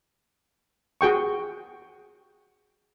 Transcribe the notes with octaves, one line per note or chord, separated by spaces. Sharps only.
F#4 G#4 G5 C#6